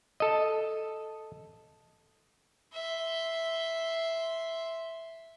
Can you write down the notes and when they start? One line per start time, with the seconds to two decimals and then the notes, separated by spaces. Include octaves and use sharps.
0.20 A4 D#5
2.72 E5 C6